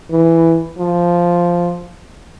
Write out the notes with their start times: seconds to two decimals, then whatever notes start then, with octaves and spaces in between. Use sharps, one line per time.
0.11 E3
0.79 F3